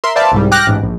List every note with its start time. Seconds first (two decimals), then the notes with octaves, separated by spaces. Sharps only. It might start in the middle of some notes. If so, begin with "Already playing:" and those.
0.04 A#4 E5 C6
0.15 B4 C5 D5 E5 F5 A5
0.32 C2 G#2 G3
0.51 G5 D6 F6 F#6 A#6
0.67 A1 G#2
0.82 A#1